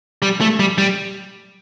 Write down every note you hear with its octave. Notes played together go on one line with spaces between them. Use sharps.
G3
A3
G3
G3